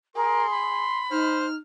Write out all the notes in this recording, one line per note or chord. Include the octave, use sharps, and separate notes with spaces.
G#4 A#4 C6
B5
D#4 C5 F6